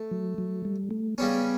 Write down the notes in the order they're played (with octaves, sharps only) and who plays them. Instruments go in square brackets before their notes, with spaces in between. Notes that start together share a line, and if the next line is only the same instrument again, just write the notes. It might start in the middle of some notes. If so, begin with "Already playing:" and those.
Already playing: [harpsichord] A3
[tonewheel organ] F#3
F#3
G3
A3
[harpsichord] C#3 G3 C#4 [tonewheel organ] B3